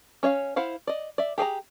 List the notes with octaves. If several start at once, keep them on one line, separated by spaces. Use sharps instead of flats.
C#4 C#5 D#5 F5
E4 C5 F5 F#5
D5 D#5
D5 E5
G4 G#4 G#5 A#5